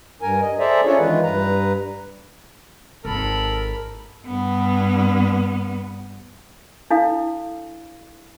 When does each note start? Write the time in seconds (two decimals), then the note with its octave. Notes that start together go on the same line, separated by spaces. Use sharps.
0.22 G2 A#4 G#5
0.41 D#5
0.59 G#4 A4 C5 D5 E5 A#5
0.85 C#4 D4 F4 G#4 A4 C#5
0.99 D#3 E3 G#3 F4 B4
1.23 G2 B4 A#5
3.05 G#1 F4 A4 A#4 B5
4.26 G2 B3
6.90 D4 E4 A4 F5